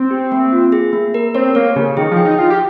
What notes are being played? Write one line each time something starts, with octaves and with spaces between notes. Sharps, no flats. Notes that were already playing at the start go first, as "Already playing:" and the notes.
Already playing: C4
G4
A#3
F4
G#4
A#3
A#4
C4 C#5
A#3 C#5
C#3 G4
D#3 G#4
F3
G5
D#4
F4 G5
G4